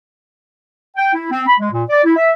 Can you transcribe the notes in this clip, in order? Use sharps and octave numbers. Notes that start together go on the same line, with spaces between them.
G5
E4
C4
B5
G#3
A#2
D5
E4
E5